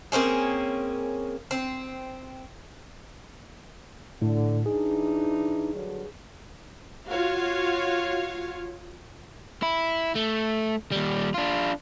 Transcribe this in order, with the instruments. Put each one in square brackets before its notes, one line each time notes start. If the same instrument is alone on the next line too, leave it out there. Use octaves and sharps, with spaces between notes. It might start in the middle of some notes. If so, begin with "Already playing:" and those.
[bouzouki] A#3 C4 C#4 G#4
C4
[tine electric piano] A2 [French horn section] D3
[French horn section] E3 D4 D#4 [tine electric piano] G#4
[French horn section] G2 D3 F#3
[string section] F4 F#4 C#5 F5
[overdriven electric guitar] E4
A3
D#2 G3
D4 F4